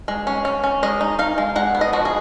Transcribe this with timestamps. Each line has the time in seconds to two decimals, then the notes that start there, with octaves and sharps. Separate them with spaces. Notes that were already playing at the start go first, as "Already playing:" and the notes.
0.08 G#3
0.27 C#4
0.45 C#4
0.64 C#4
0.83 G#3 D#5
1.01 D#4
1.19 D#4 F5
1.38 G#3
1.56 G#3 F#5
1.75 B3
1.81 D#5
1.93 F3 F#4
2.05 G#4